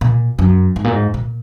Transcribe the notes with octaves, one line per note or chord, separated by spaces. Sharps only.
A#2
F#2
G#2
A#2
G#2
A#2